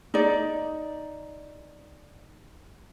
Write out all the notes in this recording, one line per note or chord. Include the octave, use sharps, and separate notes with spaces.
D#4 D5